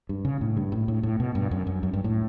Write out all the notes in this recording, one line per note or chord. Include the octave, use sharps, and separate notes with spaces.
G2
C#3
A2
G2
A2
A2
A2
B2
G2
F#2
F#2
F#2
G2
A2